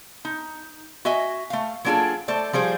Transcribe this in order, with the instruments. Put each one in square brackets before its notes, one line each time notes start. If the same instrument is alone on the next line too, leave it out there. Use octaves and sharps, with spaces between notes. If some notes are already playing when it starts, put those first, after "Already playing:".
[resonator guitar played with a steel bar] D#4
F#4 D#5 E5 G#5
A3 F5
F#3 A#3 D4 F4 G#4 A4
A3 A4 C5 D5
F3 G3 G#4 C5